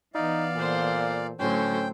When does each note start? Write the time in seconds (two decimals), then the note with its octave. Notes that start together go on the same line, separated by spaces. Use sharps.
0.15 E3 B3 D#4 D5 F5
0.56 A#2 A4 C5
1.39 A2 D3 F#3 C#4 A4 C5 G5